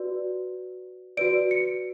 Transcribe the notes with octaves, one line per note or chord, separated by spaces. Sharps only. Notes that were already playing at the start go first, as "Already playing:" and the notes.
Already playing: F#4 B4 D5
F#4 B4 D5 D7
C#7